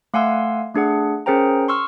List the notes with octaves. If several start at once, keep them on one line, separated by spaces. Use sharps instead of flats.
A3 F5 F#5 G#5 C6 E6
A3 D4 G#4 F#5
C#4 G#4 A#4 C5 G5 A#5
C6 C#6 E6 F6